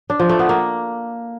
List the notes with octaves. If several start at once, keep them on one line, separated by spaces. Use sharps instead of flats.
D4
F3
A3
B3
A#3